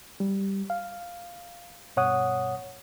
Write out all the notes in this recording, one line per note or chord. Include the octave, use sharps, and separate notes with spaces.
G3
F5
G2 B2 C#5 F#5 D#6